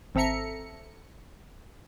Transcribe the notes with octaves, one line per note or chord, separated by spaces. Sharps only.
G#1 C4 A4 E5 A#5 C#7